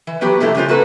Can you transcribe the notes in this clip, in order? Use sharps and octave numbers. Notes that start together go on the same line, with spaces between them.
E3
F#3 B3 F#4 G4 B4
G2 C3 F3 A3 A#3 E4
C#3 G3 G#3 F4 C5
A#3 F#4 A4 B4